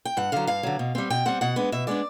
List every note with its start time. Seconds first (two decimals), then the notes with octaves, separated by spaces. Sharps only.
0.05 G5
0.17 G2 F#5
0.32 D3 F#3 F5
0.47 G2 F5
0.63 D3 F#3
0.79 B2
0.95 G3 C4
1.10 B2 G5
1.25 G3 C4 F#5
1.41 B2 F#5
1.56 G#3 B3 D4
1.72 B2 E5
1.87 G#3 B3 D4 D5